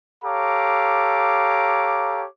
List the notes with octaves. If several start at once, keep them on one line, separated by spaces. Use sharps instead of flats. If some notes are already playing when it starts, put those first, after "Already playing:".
G4 A4 C#5 F5 A#5 D6